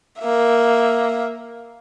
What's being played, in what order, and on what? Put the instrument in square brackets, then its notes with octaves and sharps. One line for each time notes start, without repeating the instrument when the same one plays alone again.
[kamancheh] A#3 E5